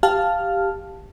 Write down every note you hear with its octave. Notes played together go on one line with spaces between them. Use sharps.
G4 F5 A5 F6